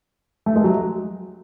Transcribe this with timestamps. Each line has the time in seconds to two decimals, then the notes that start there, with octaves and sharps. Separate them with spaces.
0.46 A3
0.56 G#3
0.64 F#3